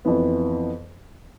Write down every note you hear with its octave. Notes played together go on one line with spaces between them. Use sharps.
F2 E3 B3